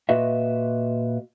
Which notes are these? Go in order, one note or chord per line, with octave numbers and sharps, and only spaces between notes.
A#2 F#4 B4 D#5 E5